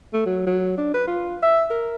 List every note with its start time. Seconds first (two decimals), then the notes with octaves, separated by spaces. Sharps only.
0.14 A3
0.26 F#3
0.46 F#3
0.78 D4
0.94 B4
1.07 F4
1.43 E5
1.70 A#4